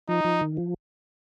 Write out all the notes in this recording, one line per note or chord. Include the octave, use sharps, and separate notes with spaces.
F3 D#4
F3
D#3
F3